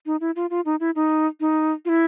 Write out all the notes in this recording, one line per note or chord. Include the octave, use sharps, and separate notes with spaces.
D#4
E4
F4
F4
D#4
E4
D#4
D#4
F4
E4